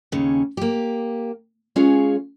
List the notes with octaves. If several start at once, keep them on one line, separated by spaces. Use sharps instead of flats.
D#2 C#3 C#4
A#3 G4
G#3 C#4 F4 G#4 C#5 F5